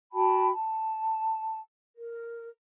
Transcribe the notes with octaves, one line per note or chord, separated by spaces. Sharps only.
F#4 G5 A5 B5
A5
A#4